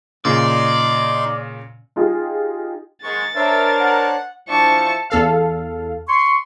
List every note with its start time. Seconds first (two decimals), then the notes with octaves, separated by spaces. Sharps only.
0.25 A#2 C#3 D#4 D5 C6
1.96 D#4 F4 G4 G#4
3.04 G#2 D#3 G#3 C#6 A6
3.36 D4 A#4 C5 C#5 E5
3.80 F#5
4.48 F3 D4 E4 C5 E5 A5 C#6
5.10 E2 A4 F5
6.07 C6 C#6